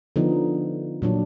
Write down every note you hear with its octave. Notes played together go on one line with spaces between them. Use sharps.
D3 F3 B3 D#4
A#2 F#3 D4